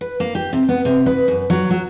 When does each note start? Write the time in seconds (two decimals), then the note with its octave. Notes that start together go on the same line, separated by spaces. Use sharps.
0.01 B4
0.20 A#3
0.35 G4
0.53 C3
0.69 B3
0.85 C3
1.06 B4
1.28 F#2
1.50 F#3
1.71 F#3